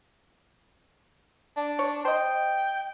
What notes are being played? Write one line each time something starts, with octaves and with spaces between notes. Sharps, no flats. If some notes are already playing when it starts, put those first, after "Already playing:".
D4
C#5
C5 D#5 G5